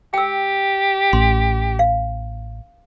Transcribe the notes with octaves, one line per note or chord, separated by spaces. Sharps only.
G4 G5 E6
A1 C6
F5